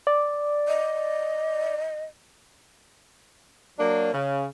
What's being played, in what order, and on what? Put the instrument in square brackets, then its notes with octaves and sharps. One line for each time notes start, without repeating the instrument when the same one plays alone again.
[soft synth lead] D5
[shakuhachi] D#5
[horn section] F#3 A#3 D4
C#3